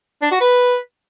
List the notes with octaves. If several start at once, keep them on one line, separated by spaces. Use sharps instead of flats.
D4
F#4
B4